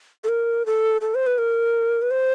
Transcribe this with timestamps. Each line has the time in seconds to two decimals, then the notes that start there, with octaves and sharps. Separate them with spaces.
0.24 A4
0.28 A#4
0.66 A4
1.01 A4
1.15 C5
1.26 B4
1.38 A#4
2.02 B4
2.11 C5